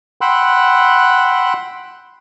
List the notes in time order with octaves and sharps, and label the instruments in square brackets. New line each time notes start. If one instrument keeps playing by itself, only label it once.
[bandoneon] F#5 G5 B5 C6 E6 F#6